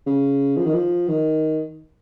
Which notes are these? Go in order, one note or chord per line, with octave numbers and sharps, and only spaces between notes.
C#3
F3
D#3
F3
D#3